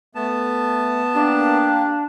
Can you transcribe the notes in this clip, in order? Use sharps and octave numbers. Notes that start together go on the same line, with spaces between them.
A3 B3 A5
A#3 D4 G4